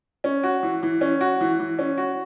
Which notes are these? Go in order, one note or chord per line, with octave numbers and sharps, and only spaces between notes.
C#4
F#4
E3
E3
C#4
F#4
E3
E3
C#4
F#4